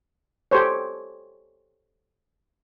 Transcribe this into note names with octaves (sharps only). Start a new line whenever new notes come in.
G4 A4 C5 C#5